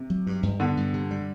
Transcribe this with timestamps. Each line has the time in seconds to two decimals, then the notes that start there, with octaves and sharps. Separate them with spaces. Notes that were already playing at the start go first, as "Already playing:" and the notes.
Already playing: C3
0.10 F#3
0.27 G2
0.43 G2
0.60 D3 B3
0.77 G2
0.94 C3
1.11 G3